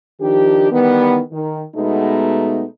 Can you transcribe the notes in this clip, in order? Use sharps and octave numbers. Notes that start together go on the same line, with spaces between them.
D#3 F3 D4 G4
D#3 E3 G3 B3
D#3
B2 G#3 A3 B3 D#4